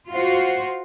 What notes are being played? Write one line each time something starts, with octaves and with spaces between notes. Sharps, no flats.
F4 F#4 C5